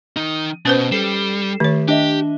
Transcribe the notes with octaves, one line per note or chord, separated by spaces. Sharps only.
D#3 D#4
B2 C#4 B4 C5
G3 A4 C7 E7
D#3 A3 G4 C#5
D4 G4 D#5 E5